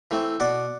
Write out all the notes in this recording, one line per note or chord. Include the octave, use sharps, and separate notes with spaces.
E3 A3 C4
B2 D5 F#5